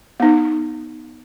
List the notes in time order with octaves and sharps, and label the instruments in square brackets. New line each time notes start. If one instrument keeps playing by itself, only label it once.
[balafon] B3 D#4